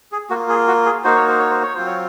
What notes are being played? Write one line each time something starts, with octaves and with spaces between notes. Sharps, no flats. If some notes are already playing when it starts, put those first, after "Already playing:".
G#4
A#3 F4 F#4
G#4
F#4
G#4
A#3 D#4 F#4 C5
C#5
C5
C#5
C5
C#5
F#3 C4 F4 C5
C#5